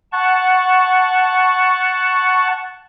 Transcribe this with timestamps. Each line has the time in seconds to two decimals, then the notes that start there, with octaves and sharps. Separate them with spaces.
0.12 F#5 A5 C#6